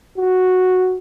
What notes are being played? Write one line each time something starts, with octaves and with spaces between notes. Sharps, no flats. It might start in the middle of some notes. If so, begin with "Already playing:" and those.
F#4